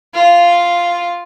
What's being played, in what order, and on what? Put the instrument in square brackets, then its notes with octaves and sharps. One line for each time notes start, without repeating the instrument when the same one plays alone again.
[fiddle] F4